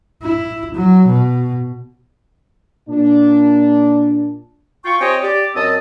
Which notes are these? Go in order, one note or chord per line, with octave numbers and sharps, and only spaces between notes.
E4
F#3
B2
A#2 D4
F4 G5 C#6
C4 G4 C#5 D#5 G5 G#5
G4 D5
F#2 C4 D#5 A5 D#6 E6